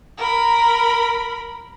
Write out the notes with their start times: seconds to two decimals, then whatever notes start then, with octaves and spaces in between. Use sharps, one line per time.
0.18 A#4 B5